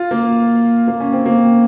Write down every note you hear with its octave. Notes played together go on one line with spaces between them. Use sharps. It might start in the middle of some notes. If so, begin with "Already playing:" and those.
Already playing: F4
A#3
A#3
C#4
C4
A#3